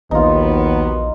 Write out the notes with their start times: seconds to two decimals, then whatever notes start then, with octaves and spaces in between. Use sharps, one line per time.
0.11 A#1 D#2 D#3 F#3 B3 D#4 F4